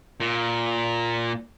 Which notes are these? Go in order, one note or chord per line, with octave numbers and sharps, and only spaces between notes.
A#2